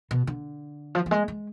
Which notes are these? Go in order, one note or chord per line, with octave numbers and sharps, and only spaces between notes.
B2
D3
F3
F3
G#3
G#3